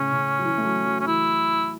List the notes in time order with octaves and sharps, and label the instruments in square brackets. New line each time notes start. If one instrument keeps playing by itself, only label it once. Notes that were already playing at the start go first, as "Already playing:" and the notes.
Already playing: [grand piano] A2 C#3 [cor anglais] C#4
[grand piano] C#3
F#3
E3
A3
F#3
F#3
[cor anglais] C#4
[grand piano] E3 [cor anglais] E4